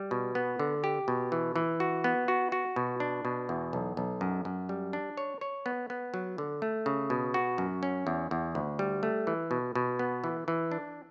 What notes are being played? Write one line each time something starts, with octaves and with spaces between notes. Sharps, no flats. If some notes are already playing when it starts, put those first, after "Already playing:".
Already playing: G3
B2
B3
D3
G4
B2
E3
E3
F#4
B3
F#4
F#4
B2
D4
B2
E2
B1
B1
F#2
F#2
G3
D4
C#5
C#5
B3
B3
F#3
D3
A3
C#3
B2
F#4
F#2
C#4
E2
E2
D2
G3
A3
E3
B2
B2
B3
E3
E3
D4